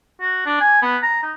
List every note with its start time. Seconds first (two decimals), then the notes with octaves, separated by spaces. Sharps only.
0.21 F#4
0.46 D4
0.60 G#5
0.82 B3
1.03 A#5
1.23 D#4